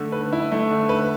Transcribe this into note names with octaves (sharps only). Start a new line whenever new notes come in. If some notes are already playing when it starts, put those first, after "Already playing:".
Already playing: D3 A3
B4
E4
A3
D3
B4